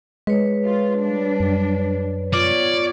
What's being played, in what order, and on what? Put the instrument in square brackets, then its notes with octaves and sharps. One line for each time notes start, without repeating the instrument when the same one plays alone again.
[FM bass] G#3 [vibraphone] B4 C#5
[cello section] F4
G3 D4
[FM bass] F#2
[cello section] B3 C#5 [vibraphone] F4 [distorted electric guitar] D5